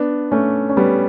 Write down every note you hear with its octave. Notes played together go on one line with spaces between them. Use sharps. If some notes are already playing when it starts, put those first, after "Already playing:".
Already playing: B3 D4
A3 C#4
C#4
G3 B3